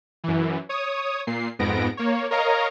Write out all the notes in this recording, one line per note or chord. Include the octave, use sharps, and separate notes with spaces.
F#2 E3
C#5 D#6
A#2 C7
F2 G#2 B3 A#6 D7
A#3 C#5
A#4 C#5 D#5 F5 A#5